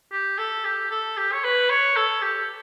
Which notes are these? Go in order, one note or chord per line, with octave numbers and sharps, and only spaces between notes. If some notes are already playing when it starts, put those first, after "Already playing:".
G4
A4
G4
A4
G4
C#5
B4
C#5
A4
G4